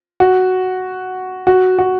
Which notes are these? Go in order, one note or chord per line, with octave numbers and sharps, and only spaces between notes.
F#4
F#4
F#4